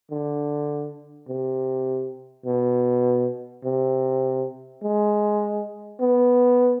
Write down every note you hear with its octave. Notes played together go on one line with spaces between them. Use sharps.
D3
C3
B2
C3
G#3
B3